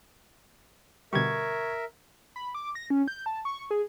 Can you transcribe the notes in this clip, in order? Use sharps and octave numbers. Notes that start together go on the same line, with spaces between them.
B2 D3 G3 A#4 E5 C#6 G#6
B5
D6
A#6
C#4
G6
A5
C#6
G#4